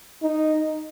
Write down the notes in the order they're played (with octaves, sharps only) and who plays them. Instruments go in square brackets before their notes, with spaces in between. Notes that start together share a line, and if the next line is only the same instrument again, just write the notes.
[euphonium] D#4